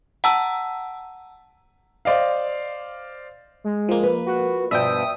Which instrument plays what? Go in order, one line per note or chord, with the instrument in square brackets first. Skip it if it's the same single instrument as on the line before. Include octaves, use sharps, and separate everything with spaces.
[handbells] F#5 A5 A#5 E6
[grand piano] C5 D5 D#5 F5
[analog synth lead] G#3
[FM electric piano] F3 A#3
[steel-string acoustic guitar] B4
[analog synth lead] F#4
[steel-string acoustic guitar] G2 B2 F3 [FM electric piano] E5 G5 [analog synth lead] D#6